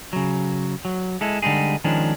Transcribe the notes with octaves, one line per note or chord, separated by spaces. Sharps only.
C#3 F#3
F#3
G#3 E4 A4
D3 G3 G#3 D#4 G#4
D#3 F3 G#3 C#4 D4